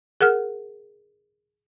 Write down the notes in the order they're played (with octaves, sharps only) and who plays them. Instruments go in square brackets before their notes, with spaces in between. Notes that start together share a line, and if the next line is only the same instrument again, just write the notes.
[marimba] G#4 A#4 F#5 F6